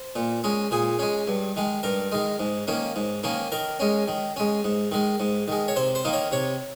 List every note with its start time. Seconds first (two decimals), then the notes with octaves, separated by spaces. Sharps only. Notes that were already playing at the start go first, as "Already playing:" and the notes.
Already playing: C5
0.16 A#2
0.44 G#3 C#4
0.71 A#2 G#4
0.99 G#3 C#4
1.27 G2
1.56 D#3 G#3
1.83 G2 A#4
2.12 D#3 G#3
2.40 G#2
2.67 D#3 A#3 C#4
2.96 G#2
3.23 D#3 A#3 C#4
3.52 D#3 A#4
3.79 G#3 C#4
4.08 D#3
4.36 G#3 C#4
4.64 G#2
4.91 D#3 G#3
5.20 G#2
5.48 D#3 G#3
5.68 C#5
5.76 C3 C5
5.95 C5
6.05 D#3 A#3 D#4
6.13 C#5
6.32 C3 C#5